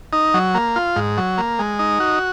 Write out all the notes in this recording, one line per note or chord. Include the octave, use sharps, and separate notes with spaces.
D#4
F#3
A#3
F4
G#2
F#3
A#3
G#3
D#4
F#4